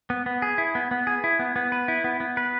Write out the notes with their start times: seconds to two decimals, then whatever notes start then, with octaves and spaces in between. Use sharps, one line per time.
0.10 B3
0.26 B3
0.42 G#4
0.58 E4
0.75 B3
0.91 B3
1.07 G#4
1.24 E4
1.39 B3
1.56 B3
1.72 B4
1.88 E4
2.04 B3
2.20 B3
2.37 B4